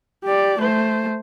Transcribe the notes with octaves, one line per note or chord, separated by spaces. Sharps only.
G4 D5
A3 C5